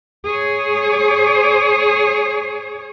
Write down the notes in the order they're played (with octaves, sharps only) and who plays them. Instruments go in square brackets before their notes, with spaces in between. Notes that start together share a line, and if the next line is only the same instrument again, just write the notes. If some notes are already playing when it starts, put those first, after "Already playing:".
[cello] G#4 C#5